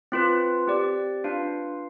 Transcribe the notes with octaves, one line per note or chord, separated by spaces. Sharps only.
C4 F4 B4
C4 G4 D5
D4 F4 B4 F5